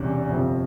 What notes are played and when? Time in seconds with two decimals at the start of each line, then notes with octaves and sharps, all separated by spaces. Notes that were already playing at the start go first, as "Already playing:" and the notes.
Already playing: E1 E2 C3 G3 C#4
0.29 G1 F2 C3 F3